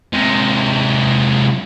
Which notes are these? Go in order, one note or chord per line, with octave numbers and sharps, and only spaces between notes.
C3 G#3